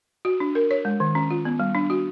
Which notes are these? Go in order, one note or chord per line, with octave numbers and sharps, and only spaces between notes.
F#4
D4
A#4
C#5
G#3
D#3
C#4
F4
B3
G3
D4
F#4